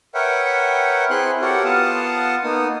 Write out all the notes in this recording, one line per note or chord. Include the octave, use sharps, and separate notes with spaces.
A#4 B4 C#5 E5 F#5 G5
C4 E4 G#4 B4 C6 F#6
F#4 G4 A4 A#4 C#5 F#5
B3 F4 F5 F#5 A5 D#6
A#3 B3 D#4 D#6